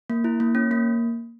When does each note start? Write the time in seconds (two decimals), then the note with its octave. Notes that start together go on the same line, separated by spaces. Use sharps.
0.10 A#3
0.24 E4
0.40 A#3
0.55 C#4
0.71 A#3